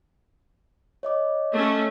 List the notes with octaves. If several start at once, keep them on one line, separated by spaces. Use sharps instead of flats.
C#5 D#5 D6
A3 C#4